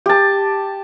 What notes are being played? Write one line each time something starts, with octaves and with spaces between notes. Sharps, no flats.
G4 A5